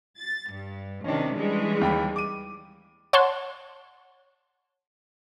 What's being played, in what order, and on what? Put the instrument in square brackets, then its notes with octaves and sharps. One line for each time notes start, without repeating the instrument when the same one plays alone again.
[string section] A6
G2
[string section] C3 D#3 [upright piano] C#4 D4
[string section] E3 G3 G#3
[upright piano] D#2 G5 B5
D6 D#7
[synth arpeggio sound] C#5 F#5 A5 C6 C#6